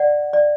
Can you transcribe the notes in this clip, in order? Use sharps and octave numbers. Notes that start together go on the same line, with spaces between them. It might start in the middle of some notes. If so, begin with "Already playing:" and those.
Already playing: D5 F#5
D5